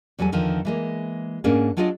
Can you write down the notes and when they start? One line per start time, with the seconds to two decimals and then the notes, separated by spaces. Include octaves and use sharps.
0.19 E2 F#3 G3 A4 G#5
0.32 E2 D3 D#3 F3
0.65 E3 G#3 A#3
1.44 G#2 A#3 C#4 D4 G#4
1.77 F#3 D4 F4 G#4 D5 D#5